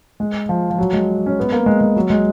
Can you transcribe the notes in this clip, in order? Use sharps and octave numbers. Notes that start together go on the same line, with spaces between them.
G#3
F3
F3
F#3
G#3
C#4
B3
A#3
G#3
G#3
F#3
G#3